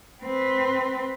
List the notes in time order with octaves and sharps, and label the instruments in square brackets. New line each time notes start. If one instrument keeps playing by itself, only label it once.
[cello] C4 B4